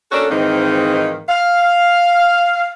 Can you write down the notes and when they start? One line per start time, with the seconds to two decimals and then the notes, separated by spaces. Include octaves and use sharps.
0.12 A#3 C#4 D4 F#4 A4
0.30 G#2 D#3 E3 A#3 C4 D#4
1.29 F5